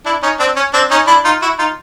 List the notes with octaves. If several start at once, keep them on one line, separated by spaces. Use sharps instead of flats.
D4 E4
C#4 D#4
C4 D4
C#4
C4 D4
C#4 D#4
D4 E4
D#4 F4
E4 F#4
D#4 F4